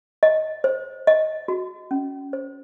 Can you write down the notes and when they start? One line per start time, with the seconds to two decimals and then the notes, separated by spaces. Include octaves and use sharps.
0.23 D#5
0.64 C5
1.07 D#5
1.48 F#4
1.91 C#4
2.33 C5